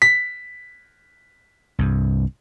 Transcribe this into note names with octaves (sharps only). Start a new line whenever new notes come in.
B6
C2 G2